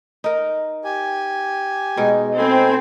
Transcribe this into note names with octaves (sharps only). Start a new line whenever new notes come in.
D#4 A#4
G4 G#5
B2 G#3 D#4
C4 A4 G#5 B5